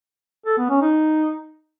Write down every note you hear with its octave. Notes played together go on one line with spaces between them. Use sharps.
A4
B3
C#4
D#4